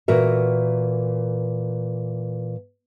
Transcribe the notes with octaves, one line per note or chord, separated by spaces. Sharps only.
A#2 E3 F#4 A#4 E5